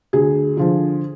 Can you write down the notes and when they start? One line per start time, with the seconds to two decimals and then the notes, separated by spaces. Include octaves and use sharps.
0.13 D2 G#4
0.57 D3 F3